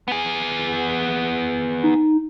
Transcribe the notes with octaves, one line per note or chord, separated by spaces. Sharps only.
B3 G#4
D#4